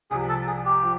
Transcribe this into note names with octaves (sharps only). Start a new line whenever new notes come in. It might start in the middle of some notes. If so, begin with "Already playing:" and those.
C2 C3 F3 G#4
A4
G#4
G4
F3